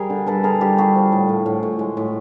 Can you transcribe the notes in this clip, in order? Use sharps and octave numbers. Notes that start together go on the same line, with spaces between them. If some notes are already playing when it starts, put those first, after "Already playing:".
Already playing: G3 G#4 A#4
D3
G3 A4 B4
D3 G#4 A#4
G3 G4 A4
G3 F#4 G#4
F3
A2
A2
A2
A2
G#3
A2